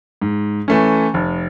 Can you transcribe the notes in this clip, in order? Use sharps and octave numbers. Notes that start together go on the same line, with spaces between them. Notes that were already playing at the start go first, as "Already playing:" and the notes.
G#2
E3 A3 C#4
F1